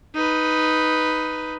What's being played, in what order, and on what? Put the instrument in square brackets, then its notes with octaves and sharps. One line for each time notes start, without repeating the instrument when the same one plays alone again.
[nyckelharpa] D#4 B4